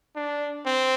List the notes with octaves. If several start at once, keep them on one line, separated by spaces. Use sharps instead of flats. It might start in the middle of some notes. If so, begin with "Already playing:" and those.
D4
C4